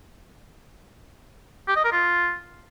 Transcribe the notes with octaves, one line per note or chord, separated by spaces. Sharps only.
G4
D#5
A#4
F4